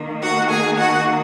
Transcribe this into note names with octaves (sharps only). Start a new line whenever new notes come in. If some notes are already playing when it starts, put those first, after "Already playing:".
Already playing: D#3 A#3
F#4 F#5
G#4 G#5
F#4 F#5